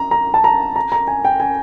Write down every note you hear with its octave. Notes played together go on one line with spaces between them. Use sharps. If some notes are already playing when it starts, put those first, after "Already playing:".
Already playing: A#5
A#5
A5
A#5
A#5
A#5
G#5
G5
G#5